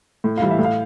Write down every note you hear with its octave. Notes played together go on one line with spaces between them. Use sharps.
A2
E3 G3 F5
E5
A2
F5